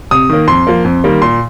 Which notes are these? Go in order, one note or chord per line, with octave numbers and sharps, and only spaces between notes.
C3 D#6
D#3 A#3
F2 C6
F3 A#3
F2
D#3 G3 A#3
A#2 C6